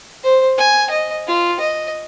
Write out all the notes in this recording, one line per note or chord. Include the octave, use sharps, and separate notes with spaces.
C5
G#5
D#5
F4
D#5